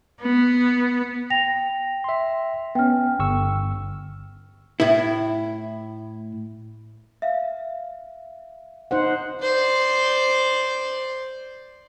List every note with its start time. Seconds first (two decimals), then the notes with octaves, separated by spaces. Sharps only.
0.20 B3
1.30 G5 A#6 F7
2.04 E5 C6
2.75 B3 C#4 G5 F6
3.19 G1 C#6 E6
4.80 A2 E4
7.22 E5 F5
8.91 D#4 C5 F#5
9.42 C5 D5